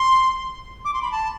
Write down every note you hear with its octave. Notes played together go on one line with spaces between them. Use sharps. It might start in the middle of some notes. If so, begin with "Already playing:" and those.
Already playing: C6
D6
C6
B5
A5